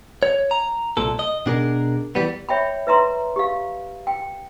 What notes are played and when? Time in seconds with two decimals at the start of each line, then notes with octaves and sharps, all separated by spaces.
0.23 C#5
0.51 A#5
0.97 C2 A#2 A4
1.19 D#5
1.46 B2 D4 G#4 A#4
2.15 E3 G3 B3
2.49 C#5 E5 G5 B5
2.87 B4 E5 A#5 C6
3.36 G4 F5
4.07 G5